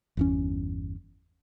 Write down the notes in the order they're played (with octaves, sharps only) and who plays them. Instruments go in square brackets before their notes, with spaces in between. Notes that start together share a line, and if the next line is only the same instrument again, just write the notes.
[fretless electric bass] G1 E2 C#4